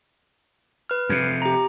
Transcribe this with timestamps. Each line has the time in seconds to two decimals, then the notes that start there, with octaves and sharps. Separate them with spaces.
0.89 B4 F6
1.09 F2 C3
1.42 G4 A#5